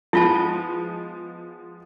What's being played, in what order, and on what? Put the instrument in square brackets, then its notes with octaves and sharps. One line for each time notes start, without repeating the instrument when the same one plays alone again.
[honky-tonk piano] F3 G#3 B3 [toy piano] E4 F4 A5